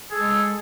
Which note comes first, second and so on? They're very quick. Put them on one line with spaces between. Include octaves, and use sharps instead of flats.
G#4 A4 G#3